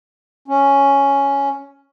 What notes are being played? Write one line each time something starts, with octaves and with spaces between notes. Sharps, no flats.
C#4